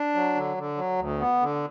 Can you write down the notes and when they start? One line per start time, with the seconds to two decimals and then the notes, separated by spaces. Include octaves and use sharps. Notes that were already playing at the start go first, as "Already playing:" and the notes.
Already playing: D4
0.14 F#3
0.35 D3
0.57 D3
0.77 F#3
0.98 D2
1.19 B3
1.41 D3